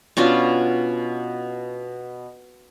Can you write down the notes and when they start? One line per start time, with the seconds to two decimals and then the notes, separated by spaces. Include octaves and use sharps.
0.17 B2 C#4 D4 F4